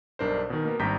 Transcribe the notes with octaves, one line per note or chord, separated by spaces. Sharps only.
B1 G2 D4 A#4 C5
B2 D#3
A#3 B3 A#4
G#1 G2 G3 A#5 G6 B6